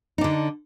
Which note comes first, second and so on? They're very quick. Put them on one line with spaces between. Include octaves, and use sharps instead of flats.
D#4 D4 D3